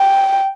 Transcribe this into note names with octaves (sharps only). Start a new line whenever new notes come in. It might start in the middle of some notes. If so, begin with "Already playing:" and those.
Already playing: G5